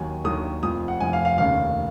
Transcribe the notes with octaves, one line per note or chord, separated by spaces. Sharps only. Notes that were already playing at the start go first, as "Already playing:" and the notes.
Already playing: D#2 D#3 F#3 G#5
D#2 D#3 F#3 D#6
F1 F2 F3 D#6
F#5
F1 F2 F3 G#5
F5
F5
F1 D#2 C#3 F5